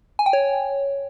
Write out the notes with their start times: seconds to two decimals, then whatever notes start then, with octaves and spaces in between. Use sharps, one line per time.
0.19 G#5
0.26 G5
0.33 C#5